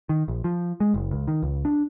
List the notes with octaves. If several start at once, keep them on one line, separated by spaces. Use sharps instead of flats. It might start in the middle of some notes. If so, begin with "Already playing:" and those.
D#3
A#1
F3
G#3
F#1
C#2
D#3
C#2
D4